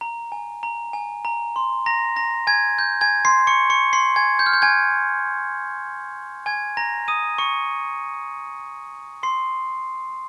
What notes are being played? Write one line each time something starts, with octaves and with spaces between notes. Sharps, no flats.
A#5
G#5
A#5
G#5
A#5
C6
A#5 A#6
A#5 A#6
G#5 G#6
G6
G#5 G#6
C6 C7
C#6 C#7
C#6 C#7
C6 C7
G#5 G#6
G6
F6
G6
G#5 G#6
G#5 G#6
A#5 A#6
D#6 D#7
C#6 C#7
C6 C7